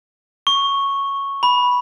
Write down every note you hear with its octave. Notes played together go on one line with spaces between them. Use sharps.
C#6
B5